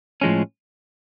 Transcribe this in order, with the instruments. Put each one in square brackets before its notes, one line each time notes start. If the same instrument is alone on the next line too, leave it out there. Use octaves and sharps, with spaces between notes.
[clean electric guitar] A2 F3 G#3 C#4